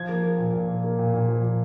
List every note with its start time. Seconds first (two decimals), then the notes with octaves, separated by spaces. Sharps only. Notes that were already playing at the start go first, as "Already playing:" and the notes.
Already playing: F3 G#6
0.09 A#3
0.23 A#3
0.38 A#2
0.53 A#2
0.69 A#3
0.84 A#3
0.99 A#2
1.14 A#2
1.28 F3
1.44 A#2